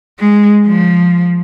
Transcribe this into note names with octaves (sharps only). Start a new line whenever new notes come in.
G#3
F3